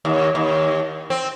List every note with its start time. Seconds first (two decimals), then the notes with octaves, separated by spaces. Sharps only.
0.05 D#2
0.35 D#2
1.10 C4